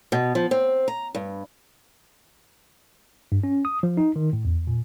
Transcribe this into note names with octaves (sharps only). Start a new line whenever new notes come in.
B2
F3
C4
A#5
G2
G2
C#4
D#6
F3
D#4
D#3
A2
E2
A#2